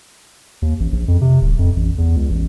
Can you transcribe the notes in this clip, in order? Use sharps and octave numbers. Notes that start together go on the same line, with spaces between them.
D#2
A1
A#1
F2
C3
D1
F2
A1
E2
C#2
A1